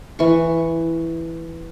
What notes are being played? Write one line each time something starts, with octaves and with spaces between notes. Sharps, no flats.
E3 C#6